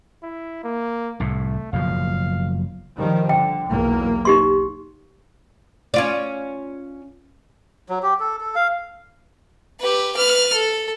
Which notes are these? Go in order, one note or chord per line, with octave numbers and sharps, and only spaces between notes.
E4
A#3
C2 A2 A3
F#1 B2 F3 F5
D#3 F3 G3
D3 G5
B1 E2 A#3
D#4 G4 C6
C#4 F4 D5
F#3
G4
A4
A4
F5
G4 B4
B4 F6
A4